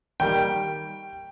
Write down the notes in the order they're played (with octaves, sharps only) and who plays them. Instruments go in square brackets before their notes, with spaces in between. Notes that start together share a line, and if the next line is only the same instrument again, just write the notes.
[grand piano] D#3 G3 A#3 G5